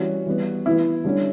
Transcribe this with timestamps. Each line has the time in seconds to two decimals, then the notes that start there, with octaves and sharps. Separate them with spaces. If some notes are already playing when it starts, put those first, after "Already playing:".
Already playing: E3 G3 C#4 F#4
0.26 E3 G3 B3
0.66 E3 B3 E4
1.04 D3 G3 C#4